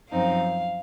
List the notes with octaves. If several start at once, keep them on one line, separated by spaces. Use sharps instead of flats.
F#2 F3 C4 D#4 F5